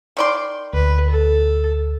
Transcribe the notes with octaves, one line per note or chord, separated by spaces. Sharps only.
D#3 D5 C6
D2 B4
A4